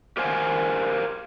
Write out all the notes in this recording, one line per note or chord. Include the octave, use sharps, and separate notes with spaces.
G4 A#4 C5 F5 G#5